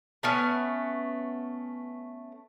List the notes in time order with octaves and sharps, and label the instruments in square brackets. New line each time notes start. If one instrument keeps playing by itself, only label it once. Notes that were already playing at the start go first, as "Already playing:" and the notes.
[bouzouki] A3 B3 C#4